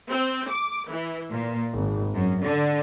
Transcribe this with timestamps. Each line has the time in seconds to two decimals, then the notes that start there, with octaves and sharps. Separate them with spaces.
0.10 C4
0.50 D6
0.91 E3
1.32 A#2
1.72 G#1
2.14 F#2
2.43 D3